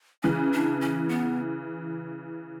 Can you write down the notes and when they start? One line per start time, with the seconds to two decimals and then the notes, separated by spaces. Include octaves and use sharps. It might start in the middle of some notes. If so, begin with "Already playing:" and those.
0.23 C#3 E3 C#4
0.53 D4
0.81 C#4
1.09 B3